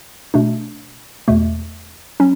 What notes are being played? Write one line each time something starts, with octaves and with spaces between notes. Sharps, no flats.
B2 A3 D4
E2 B2 A3
F#3 C#4